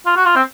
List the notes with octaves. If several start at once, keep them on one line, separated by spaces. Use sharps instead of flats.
F4
F#4
F4
C4